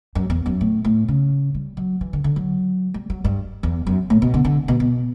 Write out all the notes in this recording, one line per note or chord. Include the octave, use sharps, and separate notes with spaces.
F#2
E2
F#2
A2
A2
C#3
G3
F#3
E3
D3
D3
F#3
G3
F#3
G2
E2
F#2
A2
B2
D3
D3
B2
B2